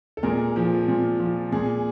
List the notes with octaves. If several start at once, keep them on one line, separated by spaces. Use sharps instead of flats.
A4
A#2 G#4 A#4
F3
A#2
F3
A#2 G#4